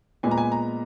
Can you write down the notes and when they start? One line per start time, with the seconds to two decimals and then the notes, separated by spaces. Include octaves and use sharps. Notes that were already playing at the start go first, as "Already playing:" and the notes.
0.23 A#2 G#3 B3 G#5
0.31 A#5
0.38 G#5
0.52 A#5